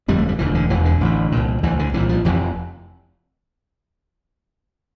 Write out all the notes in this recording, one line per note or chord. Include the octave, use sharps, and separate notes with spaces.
G1 F2 D3 G3
A3
G3
E1 D2 D3 E3
D3
E1 E2 C3 E3
D3
A1 A2
C2 A#2
D2 D3 E3
D3
C2 A#2 E3
F3
F1 F2 C3 E3